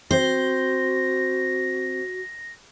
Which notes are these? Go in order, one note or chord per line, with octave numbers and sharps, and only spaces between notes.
C4 F#4 C5 A#6